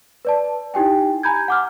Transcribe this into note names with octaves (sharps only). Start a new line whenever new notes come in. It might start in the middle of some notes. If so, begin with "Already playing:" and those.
B4 D5 A5
D#4 E4 G4 G5 G#5
G#5 A#5 B5 G6 G#6
F#5 D6 F6